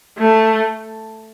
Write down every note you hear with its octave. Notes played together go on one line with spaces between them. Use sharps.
A3